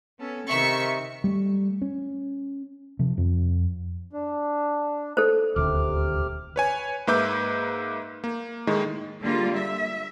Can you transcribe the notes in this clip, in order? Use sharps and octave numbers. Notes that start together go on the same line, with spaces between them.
B3 C#4 A4
C3 D#3 E5 C#6
G3 A3
C#4
C3 F3
F2
D4
A4 C5
D#1 D2 C3 D6 F6
B4 C#5 G#5
G#2 A#3 B4 E5 D6 G6
A#3
A2 D#3 G#3
D3 G3 G#3 A#3 F4
E5